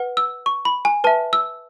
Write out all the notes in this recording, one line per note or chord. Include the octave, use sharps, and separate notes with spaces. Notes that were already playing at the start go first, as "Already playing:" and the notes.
Already playing: B4 F#5
E6
C#6
B5
G#5
B4 E5 A5
E6